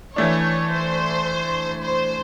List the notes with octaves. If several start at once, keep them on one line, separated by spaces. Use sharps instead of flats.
E3 A3 D4 C#5
C5
C5